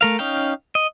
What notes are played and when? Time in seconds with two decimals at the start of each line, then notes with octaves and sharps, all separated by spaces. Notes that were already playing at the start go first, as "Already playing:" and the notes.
0.01 A3 A#4 F5
0.19 C#4 D#4 F5 G5
0.75 D#5